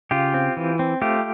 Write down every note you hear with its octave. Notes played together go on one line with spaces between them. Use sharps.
C#3 F4 G4
C4
E3
C4
A3 F4 G4